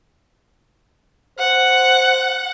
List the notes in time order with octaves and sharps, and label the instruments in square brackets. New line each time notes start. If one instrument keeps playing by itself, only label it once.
[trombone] C5 [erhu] F#5